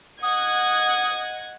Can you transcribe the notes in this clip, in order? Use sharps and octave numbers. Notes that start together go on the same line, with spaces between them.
D#5 F#5 D#6 G#6